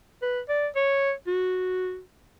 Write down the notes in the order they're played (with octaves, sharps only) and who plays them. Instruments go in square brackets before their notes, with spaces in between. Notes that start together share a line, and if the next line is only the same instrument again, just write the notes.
[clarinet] B4
D5
C#5
F#4